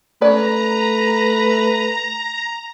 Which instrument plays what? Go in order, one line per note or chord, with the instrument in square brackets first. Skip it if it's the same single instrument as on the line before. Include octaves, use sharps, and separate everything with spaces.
[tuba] A3 [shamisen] C#4 D5 [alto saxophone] B4 [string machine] A#5